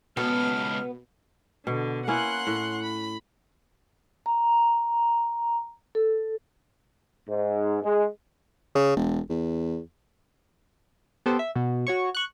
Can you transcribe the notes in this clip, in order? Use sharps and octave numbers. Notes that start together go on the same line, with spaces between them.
C#2 B2 B3 A4 F6
B2 D3
A#3 C#4 E4 F#5 C6 F#6
A2
B5
A#5
A4
G#2
G#3
C#3
E1
E2
B3 G4 A4 C5
E5
B2
F#4 C#5 C#6
C#6 F#6